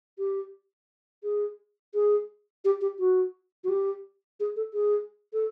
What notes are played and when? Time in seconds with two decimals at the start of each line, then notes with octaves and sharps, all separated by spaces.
0.18 G4
1.24 G#4
1.94 G#4
2.65 G4
2.81 G4
2.99 F#4
3.64 F#4
3.69 G4
4.40 G#4
4.56 A4
4.74 G#4
5.33 A4